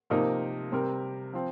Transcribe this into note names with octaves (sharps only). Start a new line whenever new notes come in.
C3 F3 A#3 D#4 A#4
C3 G3 C4 G4 A#4
F3 C4